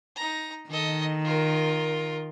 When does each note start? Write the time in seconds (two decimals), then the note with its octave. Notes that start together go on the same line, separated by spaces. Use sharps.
0.16 D#4 A#5
0.70 D#3 A4 D#5
1.24 F4 A#4